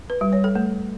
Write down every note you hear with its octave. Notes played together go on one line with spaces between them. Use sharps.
B4
G3
C#5
A4
A3